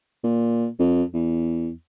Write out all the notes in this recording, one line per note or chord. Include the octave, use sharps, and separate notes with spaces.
A#2
F2
E2